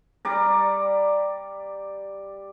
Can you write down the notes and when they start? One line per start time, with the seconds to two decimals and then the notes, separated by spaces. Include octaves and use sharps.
0.25 G3 D5 A#5